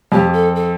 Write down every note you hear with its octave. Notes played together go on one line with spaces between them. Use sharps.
F2 G4
A4
A4